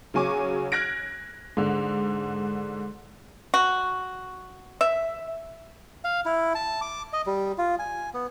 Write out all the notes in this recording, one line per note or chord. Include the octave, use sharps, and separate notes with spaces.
C#3 F#3 G#5 C#6 D6
F6 F#6 G#6 A#6 D7
G#2 D3
F#4
E5
F5
E4
A5
D6
D#5
G3
F4
G#5
B3